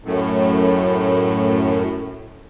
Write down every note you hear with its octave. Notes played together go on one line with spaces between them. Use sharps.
F#2 A2